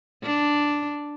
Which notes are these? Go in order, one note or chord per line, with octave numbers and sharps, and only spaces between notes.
D4